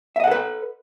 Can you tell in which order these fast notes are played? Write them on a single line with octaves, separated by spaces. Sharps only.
E5 D#5 F#5 A4 B4